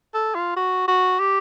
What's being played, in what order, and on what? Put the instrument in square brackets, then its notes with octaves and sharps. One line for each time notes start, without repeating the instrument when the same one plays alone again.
[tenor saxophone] A4
F4
F#4
F#4
G4